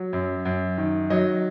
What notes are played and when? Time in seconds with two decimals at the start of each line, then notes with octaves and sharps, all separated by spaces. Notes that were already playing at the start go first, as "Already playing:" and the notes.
Already playing: F#3
0.13 F#2
0.45 F#2
0.78 D#3
1.10 F#3 D#5